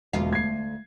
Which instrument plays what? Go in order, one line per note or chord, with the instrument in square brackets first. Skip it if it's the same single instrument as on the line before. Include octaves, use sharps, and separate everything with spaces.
[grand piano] E1 [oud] D2 F4 F5
[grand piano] G#6 C7